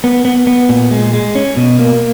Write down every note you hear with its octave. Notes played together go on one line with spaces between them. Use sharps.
B3
B3
B3
A#2
G#3
G#3
C#4
B2
A#3